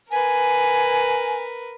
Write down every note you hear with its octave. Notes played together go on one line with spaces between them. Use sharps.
A#4 B4 G#5